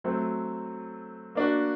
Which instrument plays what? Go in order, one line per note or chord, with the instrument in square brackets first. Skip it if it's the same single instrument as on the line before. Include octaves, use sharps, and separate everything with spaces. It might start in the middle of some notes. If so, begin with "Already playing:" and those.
[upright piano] F#3 A3 C4
A#3 D4 F#4